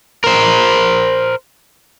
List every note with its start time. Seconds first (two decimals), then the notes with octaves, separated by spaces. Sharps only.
0.24 A#4 C5